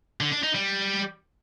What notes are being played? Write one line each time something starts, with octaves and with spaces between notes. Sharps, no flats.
D3
D4
D#4
G3